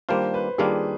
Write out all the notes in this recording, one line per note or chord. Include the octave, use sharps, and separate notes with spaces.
D#3 G3 A#3 D4 F4 C5
B4
D#3 G3 A#3 D4 F4 G#4